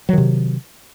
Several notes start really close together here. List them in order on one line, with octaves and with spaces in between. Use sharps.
F#3 D#3 C3